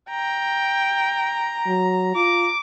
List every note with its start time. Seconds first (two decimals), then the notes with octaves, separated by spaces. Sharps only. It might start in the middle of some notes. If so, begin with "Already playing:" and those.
0.10 G5 A#5
1.67 F#3
2.16 F4 D6